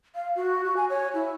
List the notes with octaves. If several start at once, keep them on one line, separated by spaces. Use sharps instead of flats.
F5
F#4
F#4
G#5
C#5
E4